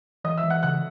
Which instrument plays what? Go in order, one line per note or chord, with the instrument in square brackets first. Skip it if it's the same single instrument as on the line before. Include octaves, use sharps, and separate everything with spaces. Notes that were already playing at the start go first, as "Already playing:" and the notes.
[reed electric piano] E3 [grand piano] D#5 D#6
[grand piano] E5 E6
[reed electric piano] E3
[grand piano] F#5 F#6
[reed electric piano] C#3 [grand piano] F#5 F#6